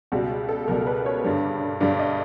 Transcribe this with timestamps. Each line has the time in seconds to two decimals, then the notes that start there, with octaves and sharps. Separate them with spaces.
0.12 C#2 B2 G3 F#4
0.49 A4
0.68 C#2 B2 G3 A#4
0.87 B4
1.06 C#5
1.24 G2 D3 G3
1.81 G2 D3 G3 D5
1.99 D#5